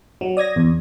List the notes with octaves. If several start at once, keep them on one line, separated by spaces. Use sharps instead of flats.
F#3
D5 D#6 G#6 A#6
E2